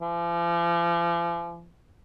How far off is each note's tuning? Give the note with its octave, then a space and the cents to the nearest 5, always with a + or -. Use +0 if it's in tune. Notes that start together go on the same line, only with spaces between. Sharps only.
F3 -40